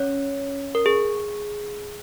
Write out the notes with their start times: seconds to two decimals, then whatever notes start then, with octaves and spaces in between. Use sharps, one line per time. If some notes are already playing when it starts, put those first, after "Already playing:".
Already playing: C#4 C#5
0.75 A#4
0.86 G#4